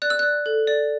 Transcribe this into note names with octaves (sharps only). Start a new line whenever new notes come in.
D5 F#6
E6
D5 F#6
A4
D5